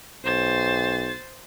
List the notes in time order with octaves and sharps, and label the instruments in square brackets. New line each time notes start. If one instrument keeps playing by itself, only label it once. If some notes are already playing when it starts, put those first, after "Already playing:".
[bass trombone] B1 [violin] C5 A6